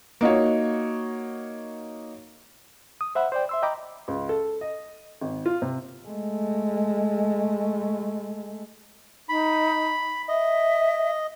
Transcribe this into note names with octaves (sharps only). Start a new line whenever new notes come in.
A#3 D#4 F#4 C#5
D#6
C5 E5 F#5 B5
C5 D5 G5
E5 C6 E6
D#5 G5 A#5 B5 D6
C#2
A4
D#5
G#1
F4
C3
G#3 A3
D#4 B5
D#5 E5